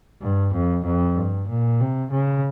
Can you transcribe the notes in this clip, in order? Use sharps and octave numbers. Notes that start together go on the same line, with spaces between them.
G2
F2
F2
G2
A#2
C3
C#3